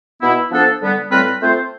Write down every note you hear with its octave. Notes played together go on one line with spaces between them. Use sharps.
B2 B3 E4
F3 B3 D4 A4 C5
D3 G3 B3
A2 G3 C4 F4 B4
A3 C4 F4 C5